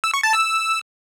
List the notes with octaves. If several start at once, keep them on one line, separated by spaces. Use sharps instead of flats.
E6
C#6
A5
E6